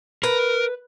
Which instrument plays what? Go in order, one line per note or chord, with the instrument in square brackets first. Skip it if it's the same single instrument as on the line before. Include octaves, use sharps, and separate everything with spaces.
[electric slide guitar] A#4 [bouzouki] B4